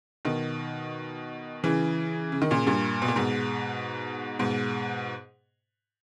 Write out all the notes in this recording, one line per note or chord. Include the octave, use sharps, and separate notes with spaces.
B2 D#3
C#3 E3
C#3
D#3
A#2 C#3
G2 A#2
B2
A#2
G#2 B2
G#2 B2